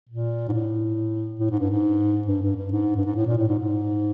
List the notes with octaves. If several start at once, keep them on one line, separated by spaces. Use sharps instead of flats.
A#2
G#2
A2
A2
G#2
G2
G#2
G2
G2
G2
G#2
G2
G#2
A2
A#2
A2
G#2
G#2